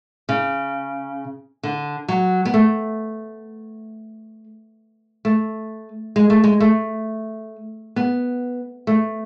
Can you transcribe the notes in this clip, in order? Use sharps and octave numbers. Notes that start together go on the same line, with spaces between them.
C#3
D3
F#3
B3
A3
A3
G#3
A3
G#3
A3
B3
A3